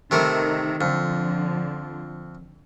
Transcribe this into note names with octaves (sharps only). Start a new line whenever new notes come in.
C3 D#3 A3 A#4
F2 D3 F3